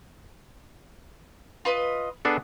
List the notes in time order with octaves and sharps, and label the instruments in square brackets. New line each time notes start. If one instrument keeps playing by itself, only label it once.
[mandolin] F4 B4 D#5
[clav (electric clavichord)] B3 D4 A4 [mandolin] G#4